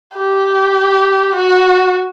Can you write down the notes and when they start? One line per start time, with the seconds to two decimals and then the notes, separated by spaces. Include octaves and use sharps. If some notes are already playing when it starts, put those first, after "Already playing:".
0.16 G4
1.35 F#4